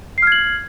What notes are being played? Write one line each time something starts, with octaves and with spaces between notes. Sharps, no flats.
F6 G#6 C7 F#7